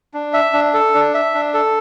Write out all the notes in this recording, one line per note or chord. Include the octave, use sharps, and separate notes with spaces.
D4
E5
D4
A4
D4
E5
D4
A4